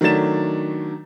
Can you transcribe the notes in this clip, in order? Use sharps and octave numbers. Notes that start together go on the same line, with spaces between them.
D#3 F#3 A3 D4 A6 E7